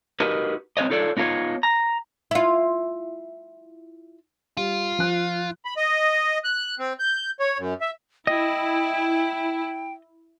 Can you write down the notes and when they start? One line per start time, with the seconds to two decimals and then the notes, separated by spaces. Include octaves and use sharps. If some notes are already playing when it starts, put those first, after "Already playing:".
0.20 D#4 F#4 G4 A#4 B4 D#5
0.77 C4 E4 B4 C#5 D#5
0.90 D#4 F4 A4 C#5 D5
1.17 B3 D#4 F4 A#4 C#5
1.63 A#5
2.31 E4 F4
4.57 G3 F4
4.99 F3 F#6
5.65 B5
5.77 D#5
6.44 F#6
6.79 C4
6.99 G6
7.40 C#5
7.58 F#2
7.81 E5
8.27 E4 D#5 G5